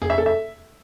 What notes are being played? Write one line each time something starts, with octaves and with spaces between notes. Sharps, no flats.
G#4
E5
A4
E5